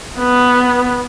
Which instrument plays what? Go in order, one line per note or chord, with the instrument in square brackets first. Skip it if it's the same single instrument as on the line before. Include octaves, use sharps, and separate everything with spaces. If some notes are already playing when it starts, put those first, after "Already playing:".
[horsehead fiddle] B3